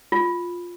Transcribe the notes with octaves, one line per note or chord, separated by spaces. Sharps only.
F4